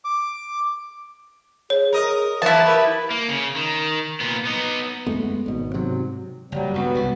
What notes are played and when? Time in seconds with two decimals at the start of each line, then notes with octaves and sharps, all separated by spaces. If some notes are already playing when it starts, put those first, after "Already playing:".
0.04 D6
1.70 G#4 C#5
1.92 G#4 A#4 D#5
2.42 E3 F#3 A#3 E4 E5 A5
2.65 G4 A#4 B4
3.11 A#3
3.29 C#3
3.56 D#3
4.20 A#2 B3
4.45 B3 D#4
5.06 F#2 G#3 A3 B3
5.46 G#1 B2
5.74 G#2 C3 F#3
6.52 F#1 F#3 G3
6.74 C#2 G2 B3 F#4
6.95 C2 G3